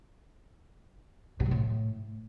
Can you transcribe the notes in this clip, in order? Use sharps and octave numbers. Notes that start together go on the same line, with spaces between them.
B2
G2
A2